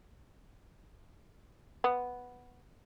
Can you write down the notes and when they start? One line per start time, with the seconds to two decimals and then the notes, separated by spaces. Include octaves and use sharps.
1.84 B3